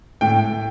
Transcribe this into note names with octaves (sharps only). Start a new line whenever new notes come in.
A2 G5